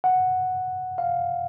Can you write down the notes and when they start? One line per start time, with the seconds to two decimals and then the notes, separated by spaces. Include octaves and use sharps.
0.04 F#5
0.98 F5